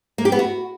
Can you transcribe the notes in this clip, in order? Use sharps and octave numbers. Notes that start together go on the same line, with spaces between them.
A#3
G4
B3
F#4